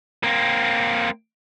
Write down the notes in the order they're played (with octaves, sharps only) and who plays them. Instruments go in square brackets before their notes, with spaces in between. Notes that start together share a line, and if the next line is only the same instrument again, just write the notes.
[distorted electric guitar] A#3 C4